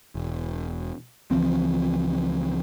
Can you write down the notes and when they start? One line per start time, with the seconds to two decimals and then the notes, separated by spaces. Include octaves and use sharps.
0.15 E1
1.31 C#2 E3 F3 C4